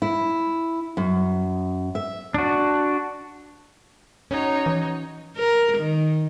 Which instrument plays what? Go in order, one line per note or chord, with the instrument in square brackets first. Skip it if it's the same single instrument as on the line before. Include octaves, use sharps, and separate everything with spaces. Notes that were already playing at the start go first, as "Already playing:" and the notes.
[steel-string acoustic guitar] E4
F#2
E5
[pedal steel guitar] D4 F#4
[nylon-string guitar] C#4 [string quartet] D#4 F#4 C#5
[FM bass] E3
[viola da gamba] A#4
D#3